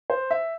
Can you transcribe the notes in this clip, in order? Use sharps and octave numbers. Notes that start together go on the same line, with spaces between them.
C5
E5